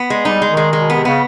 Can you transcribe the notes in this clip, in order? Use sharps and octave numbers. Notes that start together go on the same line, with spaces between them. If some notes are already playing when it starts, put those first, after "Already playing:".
Already playing: B3
G#3
G3 D#4
G#3
D#3
G#3
G#3
B2
C3 B3
C#3 B3